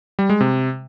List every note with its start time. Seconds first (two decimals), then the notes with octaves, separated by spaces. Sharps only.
0.19 G3
0.30 G#3
0.41 C3